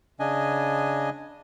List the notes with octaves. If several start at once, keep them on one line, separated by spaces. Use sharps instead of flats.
C#3 D4 D#5 G#5